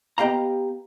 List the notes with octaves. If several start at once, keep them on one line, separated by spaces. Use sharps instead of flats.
B3 G4 D#5 F5 A#5